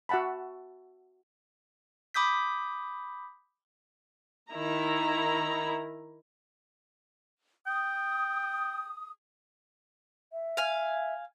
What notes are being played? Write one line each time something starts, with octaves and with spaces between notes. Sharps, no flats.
F#4 E5 F#5 A5 B5
B5 D6 D#6 G6 B6
D#3 E4 A#5
G5 D#6
E5
F5 G#5